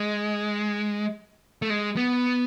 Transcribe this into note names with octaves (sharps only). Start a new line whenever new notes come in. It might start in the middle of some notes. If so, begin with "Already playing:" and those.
Already playing: G#3
A3
G#3
B3